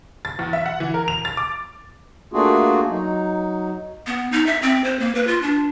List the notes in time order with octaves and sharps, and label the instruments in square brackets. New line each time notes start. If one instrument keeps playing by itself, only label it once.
[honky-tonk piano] A6
E2
E5
F#5
E3
A#4
F7
A6
D6
[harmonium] A3 A#3 D4 F4 F#4 G#4
F#3 D#4
[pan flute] B3
D#4
E5
C4
C5
A#3
B4
F4
D4